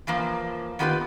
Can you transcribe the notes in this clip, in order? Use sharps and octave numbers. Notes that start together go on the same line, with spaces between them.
E3 F3 A#3
D#3 B3 F4 G4 A4 B4